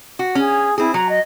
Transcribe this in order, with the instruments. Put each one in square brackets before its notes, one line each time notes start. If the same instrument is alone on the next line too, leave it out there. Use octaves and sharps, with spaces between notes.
[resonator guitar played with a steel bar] F#4
[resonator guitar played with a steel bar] C#4 [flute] G#4
[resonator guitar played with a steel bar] C4 G#4 [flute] E4
[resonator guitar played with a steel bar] F#3 [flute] A#5
[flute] D#5